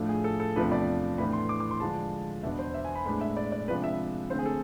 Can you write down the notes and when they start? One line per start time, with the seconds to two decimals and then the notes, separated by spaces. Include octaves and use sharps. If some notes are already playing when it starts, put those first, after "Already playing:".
Already playing: A2 F3 A3 D4
0.09 G#4
0.24 A4
0.40 A4
0.56 E2 C3 F3 A3 D4 B4
0.72 D5
1.18 A2 E3 B3 D4 B5
1.33 C6
1.49 D6
1.60 D6
1.71 C6
1.80 D3 F3 G#3 D4 A5
2.43 E2 B2 B3 D4 E5
2.59 C5
2.74 E5
2.85 G#5
2.95 B5
3.06 A2 G#3 B3 D4 B5
3.21 E5
3.37 D5
3.52 D5
3.68 C3 F3 G#3 D4 B4
3.84 E5
4.30 D3 A3 C4 C5
4.39 G#4
4.46 A4